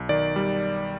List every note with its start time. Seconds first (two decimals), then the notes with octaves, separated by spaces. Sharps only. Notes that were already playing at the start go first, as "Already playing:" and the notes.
Already playing: B1
0.09 D#3 D5
0.36 G3